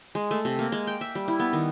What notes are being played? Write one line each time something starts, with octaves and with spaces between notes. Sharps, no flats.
G#3
A3
C3
A#3
G#3
G5
E5
G3
E4
B3
D#3